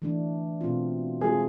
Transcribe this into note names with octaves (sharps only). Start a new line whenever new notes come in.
E3 A3 D4
B2 A3 C4 F4
F3 G#3 C4 F4 G#4 A4